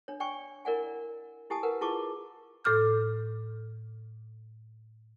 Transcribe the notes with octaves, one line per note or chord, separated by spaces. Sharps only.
D4 C#5
D5 G5 G#5 C#6
E4 A#4 D5 F#5 G#5
E4 G4 G#5 A5 D#6
A#4 B4 F#5
E4 F4 G#4 A5 C#6 D6
A2 A4 D6 F6 G6